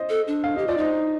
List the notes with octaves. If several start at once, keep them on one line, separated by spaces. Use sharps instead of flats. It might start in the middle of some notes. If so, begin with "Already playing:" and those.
Already playing: C5 D#5
A4
D4
F5
G4 D#5
F4 D5
D#4 C5 D#5